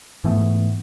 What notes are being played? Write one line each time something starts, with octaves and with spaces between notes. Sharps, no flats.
G#2 E3 A3 B3